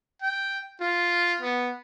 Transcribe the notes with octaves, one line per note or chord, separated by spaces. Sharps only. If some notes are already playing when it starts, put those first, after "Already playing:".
G5
F4
B3